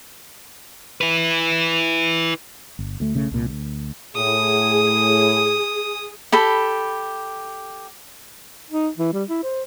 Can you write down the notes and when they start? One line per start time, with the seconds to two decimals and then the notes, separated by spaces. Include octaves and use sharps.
1.01 E4 B4
2.79 G1
3.00 D2 A3
3.14 B1 C#3 A3
3.31 C2 A#2
3.50 D2
4.16 A2 G#4 D#6
6.32 G4 A4 B5
8.70 D#4
8.98 E3
9.13 G3
9.29 E4
9.43 C5